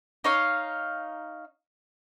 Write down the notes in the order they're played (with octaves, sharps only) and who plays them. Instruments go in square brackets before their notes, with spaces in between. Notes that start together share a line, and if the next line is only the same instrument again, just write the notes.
[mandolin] D#4 C#5 F5